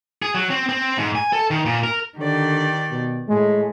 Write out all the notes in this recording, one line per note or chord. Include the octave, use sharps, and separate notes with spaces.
G#4
F#3
C4
C4
G#2
G#5
A4
D#3
A#2
A#4
D3 D#3 G4 D5
B2
A2 G#3